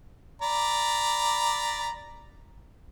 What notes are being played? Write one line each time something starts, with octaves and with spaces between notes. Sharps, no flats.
D5 A#5 B5